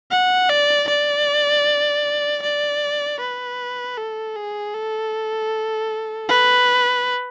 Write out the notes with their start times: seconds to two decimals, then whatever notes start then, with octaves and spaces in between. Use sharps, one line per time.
0.11 F#5
0.50 D5
0.88 D5
2.43 D5
3.20 B4
3.98 A4
4.36 G#4
4.74 A4
6.29 B4